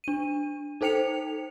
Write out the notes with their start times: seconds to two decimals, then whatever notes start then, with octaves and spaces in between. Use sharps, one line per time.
0.04 D4 D#7
0.81 D#4 A4 C5 G5 C#7 F7